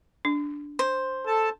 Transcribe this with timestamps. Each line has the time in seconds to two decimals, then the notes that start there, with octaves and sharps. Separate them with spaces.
0.25 D4
0.79 C5
1.27 A4 A5